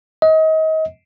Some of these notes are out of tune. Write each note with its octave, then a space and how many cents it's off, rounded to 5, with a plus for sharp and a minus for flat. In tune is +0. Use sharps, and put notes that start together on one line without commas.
D#5 +30